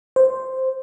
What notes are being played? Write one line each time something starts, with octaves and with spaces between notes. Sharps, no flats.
C5